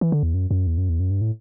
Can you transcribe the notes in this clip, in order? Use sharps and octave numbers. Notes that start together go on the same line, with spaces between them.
E3
D3
E2
F#2
F#2
E2
F#2
E2
F#2
G2
A2